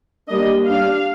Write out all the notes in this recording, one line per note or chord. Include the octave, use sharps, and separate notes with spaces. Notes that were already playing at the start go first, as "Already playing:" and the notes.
G3 A#3 D4 D#5
G3 D4 F5